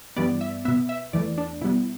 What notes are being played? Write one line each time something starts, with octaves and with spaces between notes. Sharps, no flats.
G2 E3 G3 B3 D5
E5
B2 B3 E5
E5
E2 E3 A3 D5
D4
B2 G3 B3 E4